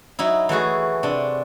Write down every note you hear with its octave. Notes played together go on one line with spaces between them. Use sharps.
F#3 D#4 E4
E3 A3 F#4 G#4
C3 D4